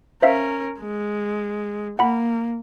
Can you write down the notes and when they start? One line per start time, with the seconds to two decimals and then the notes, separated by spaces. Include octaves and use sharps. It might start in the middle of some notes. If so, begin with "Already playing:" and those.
0.22 C#4 A#4 C5 E5 F5
0.80 G#3
1.99 A#3 F#5 B5